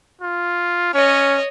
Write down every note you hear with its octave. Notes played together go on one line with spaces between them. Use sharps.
F4
C#4 C#5 D#5